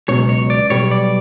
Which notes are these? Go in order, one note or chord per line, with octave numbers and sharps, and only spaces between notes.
C#2 B2 F#3 C#5
C#5
D5
B1 B2 G3 C#5
D5